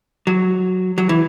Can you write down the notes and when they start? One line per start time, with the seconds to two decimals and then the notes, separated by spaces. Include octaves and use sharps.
0.27 F#3
0.98 F#3
1.09 E3